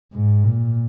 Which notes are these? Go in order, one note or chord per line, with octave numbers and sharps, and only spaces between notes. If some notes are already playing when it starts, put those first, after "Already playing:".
G#2
A#2